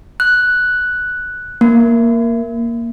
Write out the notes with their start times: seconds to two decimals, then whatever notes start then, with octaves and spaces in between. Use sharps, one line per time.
0.20 F#6
1.61 A#3